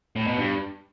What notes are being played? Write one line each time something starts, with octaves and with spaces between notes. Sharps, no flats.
A2
B2
G2